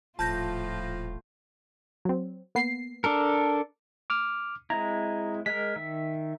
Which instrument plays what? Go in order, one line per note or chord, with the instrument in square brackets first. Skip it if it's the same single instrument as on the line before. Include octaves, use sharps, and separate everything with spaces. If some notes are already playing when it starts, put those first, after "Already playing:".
[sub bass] D#1 [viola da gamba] A2 F4 [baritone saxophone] F3 [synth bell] A5 G6 A#6
[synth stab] F#3 C4
A#3 B3 C7
[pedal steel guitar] D4 A4 A#4
[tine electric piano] D6 F6
[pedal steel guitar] G#3 C4 E4 [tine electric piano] A#5
[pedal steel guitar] G#3 A#4 [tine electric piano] B6
[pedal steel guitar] D#3 E5